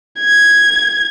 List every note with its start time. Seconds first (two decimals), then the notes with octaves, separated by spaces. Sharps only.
0.20 G#6